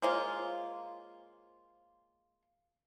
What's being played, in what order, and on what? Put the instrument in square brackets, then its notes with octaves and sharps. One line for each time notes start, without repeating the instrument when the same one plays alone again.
[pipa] G#3 A#3 F4 [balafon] C5 C#5 G#5